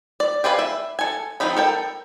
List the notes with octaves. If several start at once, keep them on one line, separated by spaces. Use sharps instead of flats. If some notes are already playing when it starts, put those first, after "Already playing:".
D5
G4 G#4 B4 D5 F5
E5
A4 G#5
D#3 F3 C4 D#4 B5
A4 A#4 G5